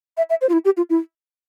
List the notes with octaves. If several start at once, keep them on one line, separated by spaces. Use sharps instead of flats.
E5
E5
C5
F4
E4
G4
F4
E4